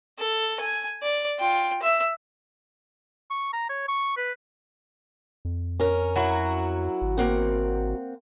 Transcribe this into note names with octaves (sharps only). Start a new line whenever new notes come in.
A4
G#5
D5
F4 G5
E5 E6
C#6
A#5
C#5
C#6
B4
F2
C#4 A#4
F#3 E4 F#4
G#1
A#3 C4 F#5